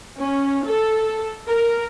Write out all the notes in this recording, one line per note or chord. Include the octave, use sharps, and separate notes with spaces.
C#4
A4
A#4